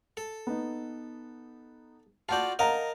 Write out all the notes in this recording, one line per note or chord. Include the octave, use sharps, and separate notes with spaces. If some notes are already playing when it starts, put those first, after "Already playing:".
A4
B3 D#4
F4 F#4 D5 A5 G6
A#4 D#5 F5 F#5 A5 A#5